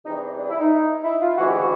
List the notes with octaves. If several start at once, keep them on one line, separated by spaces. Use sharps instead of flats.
E2 C3 E3 G3 D#4
D4
D4
E4
D#4
E4
F4
D2 C#3 E3 G#3 F#4
G4
F#4